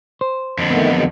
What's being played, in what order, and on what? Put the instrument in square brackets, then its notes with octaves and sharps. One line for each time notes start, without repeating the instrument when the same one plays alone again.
[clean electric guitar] C5
[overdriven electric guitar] F2 D3
[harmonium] D#3 A3 [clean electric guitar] B3
[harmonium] D#3 F#3 G#3